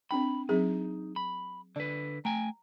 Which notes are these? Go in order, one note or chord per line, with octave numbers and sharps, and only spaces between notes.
C4 D4 G5 B5
F#3 C4 D#4 G#4
B5
D3 B4 D5
A3 G5 G#5 A#5